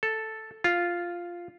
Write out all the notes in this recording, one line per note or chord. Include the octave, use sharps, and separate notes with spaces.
A4
F4